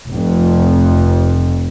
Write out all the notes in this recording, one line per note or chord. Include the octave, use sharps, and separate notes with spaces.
F1 F2